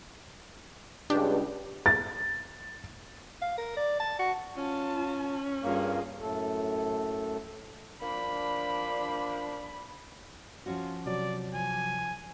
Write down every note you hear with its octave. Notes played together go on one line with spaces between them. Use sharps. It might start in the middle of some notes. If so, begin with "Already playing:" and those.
C#2 G2 D4 G4
A6
F5
A#4
D5
A5
F#4
C#4 F4 A5
G2 A#3 F4 G#4
F#2 A2 A3 A4
F3 A#3 D4 B5
F3 C#4 F4 F#4
C3 F#3 D5
F3 G#5